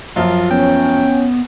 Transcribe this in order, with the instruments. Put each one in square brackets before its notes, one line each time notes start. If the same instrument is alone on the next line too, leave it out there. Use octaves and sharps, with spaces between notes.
[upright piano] F#2 F3 [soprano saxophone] F4
[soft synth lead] B3 [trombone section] C#4 [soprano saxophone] G5